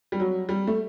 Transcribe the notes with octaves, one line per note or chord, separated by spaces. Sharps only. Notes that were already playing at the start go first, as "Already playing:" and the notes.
G3
F#3
G3
A3